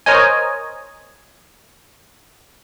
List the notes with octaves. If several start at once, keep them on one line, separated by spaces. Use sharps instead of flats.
A#4 C5 C#5 D#5 G#5